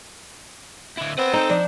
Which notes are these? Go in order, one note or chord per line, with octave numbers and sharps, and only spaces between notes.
D3 E4
C4 B4 F#5
D#4 A4 G5
F3 D4